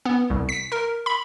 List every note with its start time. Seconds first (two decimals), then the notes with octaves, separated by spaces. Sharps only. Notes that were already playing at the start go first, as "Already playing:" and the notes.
0.05 B3
0.30 C2
0.49 B6
0.72 A#4
1.06 B5